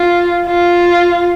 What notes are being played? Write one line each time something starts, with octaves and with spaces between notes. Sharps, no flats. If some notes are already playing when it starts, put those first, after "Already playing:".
Already playing: F4
F4